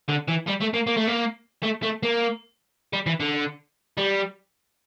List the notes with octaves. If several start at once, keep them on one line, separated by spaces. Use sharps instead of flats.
D3
E3
G3
A3
A#3
A#3
A3
A#3
A3
A3
A#3
G3
E3
D3
G3